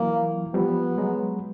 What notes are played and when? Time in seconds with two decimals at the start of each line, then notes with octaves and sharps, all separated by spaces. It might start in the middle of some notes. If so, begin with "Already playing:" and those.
Already playing: E3 F#3 A#3
0.54 F3 G3 B3
0.98 F#3 G#3